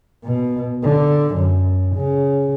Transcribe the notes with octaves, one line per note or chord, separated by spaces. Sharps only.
B2
D3
F#2
C#3